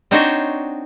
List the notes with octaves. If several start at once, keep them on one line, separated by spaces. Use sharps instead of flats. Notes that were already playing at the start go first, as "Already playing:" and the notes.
C4 D4 D#4 F#4 C5 C#5